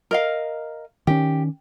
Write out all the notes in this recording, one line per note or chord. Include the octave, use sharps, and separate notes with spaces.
A#4 D#5 F5
D#3 C#4 G4